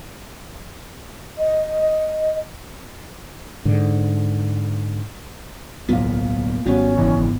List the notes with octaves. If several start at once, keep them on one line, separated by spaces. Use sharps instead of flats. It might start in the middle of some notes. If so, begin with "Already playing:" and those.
D#5
G#2 D3
D1 B1 F3 A#3 B3 F5
G#1 F3 G3 B3 C#4 F#4
F#1 E3 D#5